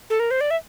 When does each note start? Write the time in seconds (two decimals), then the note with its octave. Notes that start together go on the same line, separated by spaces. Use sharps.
0.10 A4
0.20 A#4
0.31 C5
0.41 D5
0.51 E5